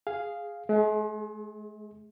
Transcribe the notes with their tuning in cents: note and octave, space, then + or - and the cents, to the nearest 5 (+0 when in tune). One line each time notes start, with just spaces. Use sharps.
G#4 +0 F5 +0
G#3 +45 G#4 +0